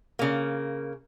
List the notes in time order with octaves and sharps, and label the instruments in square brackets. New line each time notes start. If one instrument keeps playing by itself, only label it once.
[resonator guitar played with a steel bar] C#3 A#3